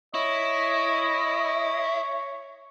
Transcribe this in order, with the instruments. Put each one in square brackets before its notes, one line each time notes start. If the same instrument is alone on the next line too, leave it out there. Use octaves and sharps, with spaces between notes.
[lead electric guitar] E4 [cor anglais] C#5 [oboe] D#5